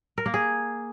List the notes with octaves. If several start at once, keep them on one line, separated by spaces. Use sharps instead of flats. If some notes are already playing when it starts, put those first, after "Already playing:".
A#4
A#3
G#4